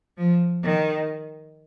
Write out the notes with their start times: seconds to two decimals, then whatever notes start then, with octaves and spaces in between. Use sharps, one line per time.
0.17 F3
0.63 D#3